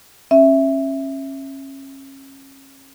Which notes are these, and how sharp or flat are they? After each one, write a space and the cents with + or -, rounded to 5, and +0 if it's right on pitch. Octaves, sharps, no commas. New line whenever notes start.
C#4 -30 E5 +0